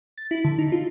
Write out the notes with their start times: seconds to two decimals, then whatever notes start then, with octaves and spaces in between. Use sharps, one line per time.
0.18 A6
0.31 E4
0.45 D3
0.59 D#4
0.72 F4